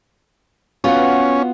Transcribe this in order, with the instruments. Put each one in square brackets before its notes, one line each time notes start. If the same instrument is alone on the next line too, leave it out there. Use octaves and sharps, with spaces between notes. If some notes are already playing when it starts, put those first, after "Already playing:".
[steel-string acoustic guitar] B3 F4 F#4 [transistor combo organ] C#4